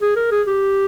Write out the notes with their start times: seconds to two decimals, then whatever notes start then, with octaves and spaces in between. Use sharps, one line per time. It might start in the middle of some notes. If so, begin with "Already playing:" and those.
0.01 G#4
0.16 A#4
0.31 G#4
0.47 G4